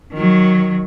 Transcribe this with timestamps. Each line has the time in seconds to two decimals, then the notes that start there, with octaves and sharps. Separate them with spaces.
0.13 D#3 F#3